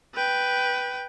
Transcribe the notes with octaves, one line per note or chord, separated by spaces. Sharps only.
B4 G5